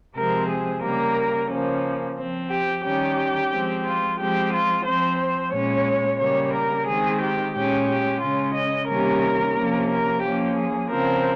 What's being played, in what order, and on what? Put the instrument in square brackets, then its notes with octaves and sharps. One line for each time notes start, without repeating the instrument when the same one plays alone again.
[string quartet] C3 F3 G#3 C4 A#4
G#4
C#3 G3 A#3 A#4
C#3 F3 A#3 C#4
F3 C4
G4
D#3 G3 C#4 G4
F3 G#3 C4
F4
F3 G#3 C4 G4
F4
F3 C4 C5
C5
A#2 G#3 C#4 C#5
C#3 G3 A#3 C#5
A#4
D#3 G#3 C4 G#4
G4
A#2 G#3 C#4 G4
G4
C#3 G#3 C#4 F4
D#5
C3 D#3 G3 A#3 C#4 A#4
C3 F3 A#3 C#4
A#4
F3 A#3 C#4 G4
G#4
C#3 F3 C4 A#4